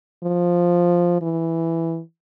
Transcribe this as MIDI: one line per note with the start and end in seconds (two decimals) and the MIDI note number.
0.23 1.18 53
1.22 2.00 52